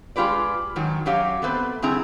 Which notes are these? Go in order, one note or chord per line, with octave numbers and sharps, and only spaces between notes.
G#3 F4 G4 B4 D5
G#2 D#3 F#3
F#2 F#3 G4 C#5 F5
A3 B3 C4 B4 C5
F#2 C#3 C4 E4 G#4 A#5